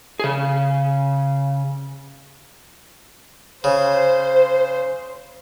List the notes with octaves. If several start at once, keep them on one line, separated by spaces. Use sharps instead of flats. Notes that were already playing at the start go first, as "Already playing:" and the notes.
C#3 G#4
C#3 C5